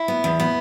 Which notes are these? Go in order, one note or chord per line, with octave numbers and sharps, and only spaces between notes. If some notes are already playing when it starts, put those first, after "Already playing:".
Already playing: E4
B3
E2
B3